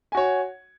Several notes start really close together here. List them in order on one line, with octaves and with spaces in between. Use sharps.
G#5 F#4 C#5